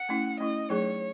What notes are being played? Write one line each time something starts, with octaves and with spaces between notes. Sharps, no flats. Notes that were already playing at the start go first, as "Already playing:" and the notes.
Already playing: F#5
A3 C#4 E4
A3 C#4 E4 D#5
F#3 A3 D#4 G#4 C#5